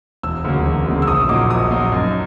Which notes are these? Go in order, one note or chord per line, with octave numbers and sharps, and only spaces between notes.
E1 E6
D2 C#3 F#3 A#3
E1
D2 C#3 F#3 A#3
E6
A#1 D#6
A#2 F#3 A#3 D#4 D6
A#1 D#6
A#2 F#3 A#3 D#4
F#2